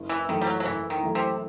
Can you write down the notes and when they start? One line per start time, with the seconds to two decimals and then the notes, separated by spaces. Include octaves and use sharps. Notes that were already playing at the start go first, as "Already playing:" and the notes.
Already playing: F#1
0.09 E3
0.29 F#2 D#3 E3 A3 E4
0.41 G3
0.47 F#3
0.60 F#3
0.65 F#1 E3
0.90 D#3
1.03 F#2 E3 A3 E4
1.15 C3